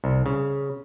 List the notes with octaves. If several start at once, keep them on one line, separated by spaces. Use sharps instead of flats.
C2
C#3